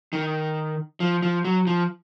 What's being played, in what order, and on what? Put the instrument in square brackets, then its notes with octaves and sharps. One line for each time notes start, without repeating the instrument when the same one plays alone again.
[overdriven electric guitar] D#3
F3
F3
F#3
F3